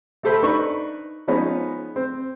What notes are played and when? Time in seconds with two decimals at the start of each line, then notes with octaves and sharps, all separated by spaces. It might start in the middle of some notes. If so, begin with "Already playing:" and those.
0.23 A3 G4 A4 C5 E5 B5
0.43 D4 D#4 B4 B5 C#6
1.28 F3 G#3 B3 C#4 D#4
1.96 C4